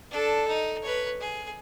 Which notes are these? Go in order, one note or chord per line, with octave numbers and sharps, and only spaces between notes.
D4 A4
D#4
B4 C#5
G#4